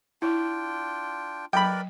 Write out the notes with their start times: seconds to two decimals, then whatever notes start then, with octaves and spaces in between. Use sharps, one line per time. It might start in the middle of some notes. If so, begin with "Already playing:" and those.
0.22 D4 E4 F4 G5
1.53 F#3 A#4 B4 D5 G5 B5